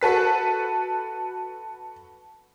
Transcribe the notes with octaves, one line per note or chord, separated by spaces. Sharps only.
F#4 A4 B4 B6